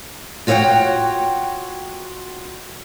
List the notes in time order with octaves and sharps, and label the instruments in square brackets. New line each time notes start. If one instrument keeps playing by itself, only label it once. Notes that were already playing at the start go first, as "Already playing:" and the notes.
[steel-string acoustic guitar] F4 F#4 C#5 E5 F#5 G5